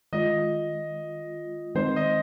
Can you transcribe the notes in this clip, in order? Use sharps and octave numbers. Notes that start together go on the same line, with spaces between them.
D#3 G#3 F4 D#5
D#3 G#3 C4 D#4 C5
D#5